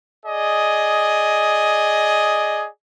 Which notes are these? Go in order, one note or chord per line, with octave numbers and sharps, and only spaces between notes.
G#4 D5 D#5